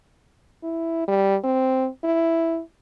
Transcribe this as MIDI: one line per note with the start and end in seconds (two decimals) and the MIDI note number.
0.64 1.07 64
1.08 1.36 55
1.44 1.88 60
2.04 2.60 64